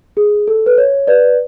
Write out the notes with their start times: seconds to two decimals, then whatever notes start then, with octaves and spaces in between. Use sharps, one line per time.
0.17 G#4
0.48 A4
0.66 B4
0.78 C#5
1.07 B4 D5